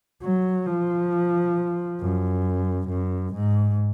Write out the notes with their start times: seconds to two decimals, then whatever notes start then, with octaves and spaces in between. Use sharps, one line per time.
0.23 F#3
0.67 F3
2.01 F#2
2.89 F#2
3.34 G#2